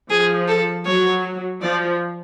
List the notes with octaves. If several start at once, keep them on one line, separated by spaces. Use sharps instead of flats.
F3 G#4
A4
F#3 C#5
F3 D5